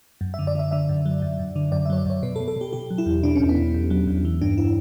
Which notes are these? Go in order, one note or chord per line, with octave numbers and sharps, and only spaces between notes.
F#2
E5
D3
D5
D3 E5
D3 E5
F#2
F#3
F#2
F#2
D3
F#2 D5
E5
F#3 C#5
D5
F#2 C#5
B2 B4
A4
B2
A4
B2 G4
B2 G4
F#3
E4
E2
B2 D4
C#4
E2
B3
B2
E2
F#3
E2
E3
G2 D4
E4